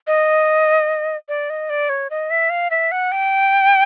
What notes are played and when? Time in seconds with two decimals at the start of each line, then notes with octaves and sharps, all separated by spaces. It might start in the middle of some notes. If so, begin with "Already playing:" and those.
0.07 D#5
1.29 D5
1.50 D#5
1.70 D5
1.89 C#5
2.10 D#5
2.30 E5
2.50 F5
2.71 E5
2.92 F#5
3.12 G5